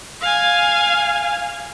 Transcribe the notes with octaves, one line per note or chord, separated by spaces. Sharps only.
F5 G#5